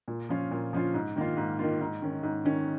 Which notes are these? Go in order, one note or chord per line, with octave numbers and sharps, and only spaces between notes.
A#2
F3 C#4 F4
A#2
F3 C#4 F4
G#2
D#3 A#3 F4
G#2
D#3 A#3 F4
G#2
D#3 C#4
G#2
D#3 C#4